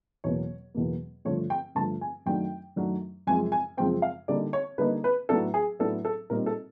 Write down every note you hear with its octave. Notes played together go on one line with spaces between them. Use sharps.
E2 B2 F#3 A#3 C#5
E2 B2 F#3 A#3
G2 D3 F3 A3 C#5
G5
G2 D3 F3 A3 A5
G#5
F#2 D#3 F#3 A3 D4 G5
F#2 D#3 F#3 A3 D4
F#2 C#3 F3 G#3 C4 G#5
G#5
F#2 C#3 F3 G#3 C4 G5
F5
D3 G3 A#3 D#4 D5
C#5
D3 G3 A#3 D#4 B4
B4
A2 F#3 B3 D4 A4
G#4
A2 F#3 B3 D4 A4
A4
A#2 G3 C4 D#4 A#4
A4